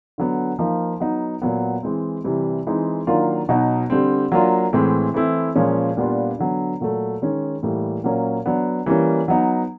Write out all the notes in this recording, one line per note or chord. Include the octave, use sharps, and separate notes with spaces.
D3 F#3 B3
F3 A#3 D#4
F#3 B3 D#4
A#2 F#3 B3
E3 G#3 C4
C3 E3 G3
E3 G#3 C4 D#4
D#3 F#3 A#3 D4 F4
B2 F#3 B3 D#4
D3 G3 C4
F#3 A#3 D4 F4
A2 E3 G#3 C4
E3 A3 C4 E4
A#2 F3 G#3 C#4
A#2 G3 B3 D4 F4
D3 F#3 B3
A#2 F#3 A3
D#3 G#3 C#4
A2 E3 G3 A#3
A#2 F#3 A#3 C#4
F#3 B3 D4
E3 G3 A#3 C#4
F#3 B3 D#4